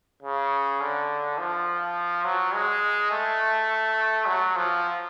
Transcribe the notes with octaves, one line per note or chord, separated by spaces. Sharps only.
C#3
D3
F3
F#3
G#3
A3
F#3
F3